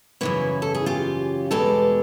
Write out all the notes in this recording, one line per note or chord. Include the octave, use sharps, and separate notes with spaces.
F#2 C#3 E3 E4 F#4
A4
G#4
F4 G4
E2 B2 G#3 G4 A4